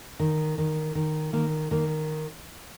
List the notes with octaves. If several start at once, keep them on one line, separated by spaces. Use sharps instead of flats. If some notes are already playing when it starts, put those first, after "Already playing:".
D#3
D#3
D#3
D#3 A#3
D#3 A#3